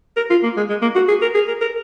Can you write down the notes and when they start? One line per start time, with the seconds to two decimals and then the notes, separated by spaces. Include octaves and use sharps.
0.17 A#4
0.30 F4
0.43 A#3
0.57 G#3
0.70 G#3
0.82 A#3
0.95 F#4
1.08 G#4
1.22 A#4
1.35 G#4
1.47 A#4
1.61 A#4